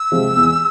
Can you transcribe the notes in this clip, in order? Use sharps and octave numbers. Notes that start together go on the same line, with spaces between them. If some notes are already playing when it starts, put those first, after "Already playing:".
Already playing: E6
C3 F3 G#3
E2